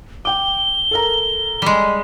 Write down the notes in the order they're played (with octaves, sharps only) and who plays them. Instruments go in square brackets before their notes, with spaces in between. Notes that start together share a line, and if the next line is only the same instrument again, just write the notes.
[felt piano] G5 D6 [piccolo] G7
[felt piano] A4 A#4 A#5
[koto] G3 G#3